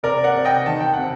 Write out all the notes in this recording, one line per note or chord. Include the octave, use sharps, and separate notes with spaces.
C3 A#4 D5
D5 F#5
C3
D#5 G5
D#3 A5
G5
C3 F#5